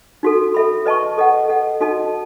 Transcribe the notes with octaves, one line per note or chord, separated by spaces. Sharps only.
D#4 F#4 A4
A4 E5 B5
B4 D#5 A5 C#6
A4 D#5 F#5
A4 D#5 F#5
D#4 F#4 A4 D#5 A5